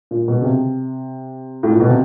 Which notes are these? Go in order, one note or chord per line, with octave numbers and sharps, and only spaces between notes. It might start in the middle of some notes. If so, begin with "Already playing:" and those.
A#2
B2
C#3
C3
A2
A#2
B2
C3